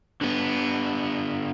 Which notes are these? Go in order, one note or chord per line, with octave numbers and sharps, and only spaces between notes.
D3 B3